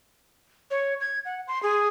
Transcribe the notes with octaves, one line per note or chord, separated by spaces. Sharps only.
C#5
G#6
F#5
C6
G#4